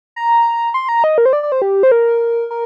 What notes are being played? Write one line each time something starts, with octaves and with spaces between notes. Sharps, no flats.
A#5
C6
A#5
D#5
A#4
C5
D5
D5
C5
G4
C5
A#4
A#4